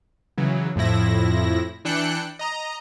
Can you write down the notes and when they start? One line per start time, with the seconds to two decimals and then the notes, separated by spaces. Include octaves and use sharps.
0.38 C#3 E3 F#3
0.76 F2 A2 F3 E4 A#6
1.85 E3 D4 G5 F#6 C#7
2.39 D#5 A#5